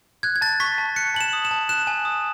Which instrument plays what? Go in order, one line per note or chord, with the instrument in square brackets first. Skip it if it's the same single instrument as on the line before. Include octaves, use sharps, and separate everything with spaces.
[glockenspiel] F#6 G#6
G#6
A5 A6
C#6 B6
A5
F#6 C#7
A5 F#7
E7
D#6
E7
A5
F#6 E7
G#5
D#6